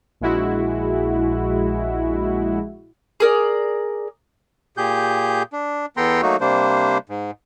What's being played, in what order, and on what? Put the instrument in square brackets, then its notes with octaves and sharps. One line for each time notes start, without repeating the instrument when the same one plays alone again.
[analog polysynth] A#1 G#3 E4 F#4
[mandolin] G#4 A#4 D5
[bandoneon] A#2 G4 G#4 G6
D4
E2 B3 A4 G5 A#5 C6
F#3 A3 A#3 D#4 F#4
C3 G3 A#3 D4 C5
G#2